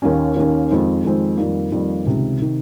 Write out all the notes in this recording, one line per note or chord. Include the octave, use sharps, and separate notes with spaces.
D#2 D#3 A#3 C#4
D#2 D#3 A#3 C#4
F2 D#3 G#3 C4
F2 D#3 G#3 C4
F2 D#3 G3 A#3
F2 D#3 G3 A#3
C#2 C3 D#3
C3 D#3